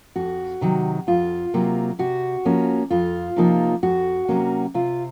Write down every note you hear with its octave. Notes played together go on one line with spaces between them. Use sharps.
F2 F#4
C3 D#3 F#3
F2 F4
C3 F#3 A#3
C3 F#4
F3 A#3 C#4
F2 F4
C3 F3 A#3 D#4
F2 F#4
C3 F#3 A#3 C#4
C3 F4